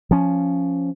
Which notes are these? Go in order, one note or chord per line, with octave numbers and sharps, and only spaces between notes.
F3 C#4